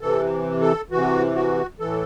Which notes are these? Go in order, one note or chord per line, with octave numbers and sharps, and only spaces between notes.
C3 E3 A4
A4
C3 E3 F#4
F#4
A2 E3 A4